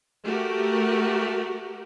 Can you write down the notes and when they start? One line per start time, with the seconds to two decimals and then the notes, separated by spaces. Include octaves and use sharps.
0.25 A3 F#4 G4 A#4